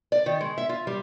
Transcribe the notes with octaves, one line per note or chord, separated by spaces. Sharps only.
D5
D#3
G#3
E5
F4
G3